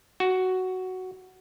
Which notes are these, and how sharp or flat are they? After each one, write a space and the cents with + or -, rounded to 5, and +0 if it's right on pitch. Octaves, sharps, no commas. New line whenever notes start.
F#4 +5